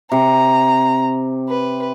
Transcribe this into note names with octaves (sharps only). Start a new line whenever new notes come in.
C3 A#5
B4